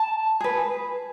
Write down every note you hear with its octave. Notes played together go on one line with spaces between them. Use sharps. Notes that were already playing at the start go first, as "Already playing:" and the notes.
Already playing: A5
G#4 B4